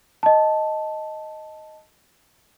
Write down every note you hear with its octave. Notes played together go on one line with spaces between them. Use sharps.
D#5 A5